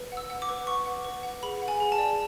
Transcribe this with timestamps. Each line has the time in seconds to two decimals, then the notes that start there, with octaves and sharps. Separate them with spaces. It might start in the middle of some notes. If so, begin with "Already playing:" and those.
Already playing: B4
0.12 F#5
0.17 E6
0.30 F#5
0.42 D6
0.49 B4
0.67 F#5 C#6
0.86 F#5
1.05 B4
1.23 F#5
1.43 G#4 B5
1.62 F#5
1.68 G#5
1.80 G#4
1.92 A5
1.98 D5